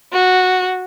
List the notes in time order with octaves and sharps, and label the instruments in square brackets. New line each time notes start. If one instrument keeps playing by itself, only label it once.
[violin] F#4